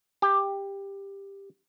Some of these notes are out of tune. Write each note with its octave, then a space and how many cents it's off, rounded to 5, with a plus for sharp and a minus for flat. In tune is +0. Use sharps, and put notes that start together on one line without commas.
G4 +10